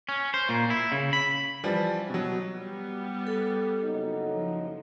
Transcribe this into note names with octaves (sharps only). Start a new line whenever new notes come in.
C#4
C5
A#2
E4
C#3
B5
E3 F3 G3
B2 F#3
G3 B3
A4
F#1 F#3 D#4
F3